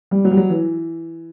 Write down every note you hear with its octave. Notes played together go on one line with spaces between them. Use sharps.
G3
F#3
G3
F#3
E3